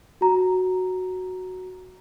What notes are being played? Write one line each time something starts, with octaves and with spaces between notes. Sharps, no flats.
F#4 A#5